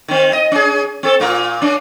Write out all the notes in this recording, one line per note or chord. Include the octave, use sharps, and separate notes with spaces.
D#3 C4
D#5
C#4 G#4
C4 A4
A#2 F4 A#4
C#4 D4